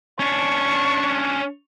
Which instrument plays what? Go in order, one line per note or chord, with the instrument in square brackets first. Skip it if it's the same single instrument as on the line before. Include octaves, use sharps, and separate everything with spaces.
[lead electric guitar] C#4 D4 [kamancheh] C#6